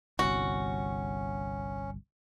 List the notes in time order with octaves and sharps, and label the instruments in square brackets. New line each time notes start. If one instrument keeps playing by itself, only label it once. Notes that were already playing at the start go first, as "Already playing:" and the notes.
[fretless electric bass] G1 C2 [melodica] C#4 [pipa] F#4